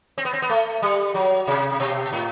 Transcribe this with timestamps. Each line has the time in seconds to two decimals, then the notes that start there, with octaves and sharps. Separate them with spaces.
0.18 C4
0.25 B3
0.33 C4
0.42 B3
0.49 A3
0.82 G3
1.14 F#3
1.47 C3
1.80 B2
2.13 A2